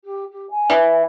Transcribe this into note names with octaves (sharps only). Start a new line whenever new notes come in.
G4
G4
G#5
E3